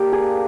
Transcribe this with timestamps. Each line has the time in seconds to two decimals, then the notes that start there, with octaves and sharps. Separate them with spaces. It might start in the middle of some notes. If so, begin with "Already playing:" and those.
Already playing: A#3 D4 G4 A#4
0.12 G#4